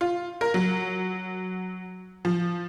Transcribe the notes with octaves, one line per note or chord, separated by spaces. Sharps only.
F4
A#4
F#3
F3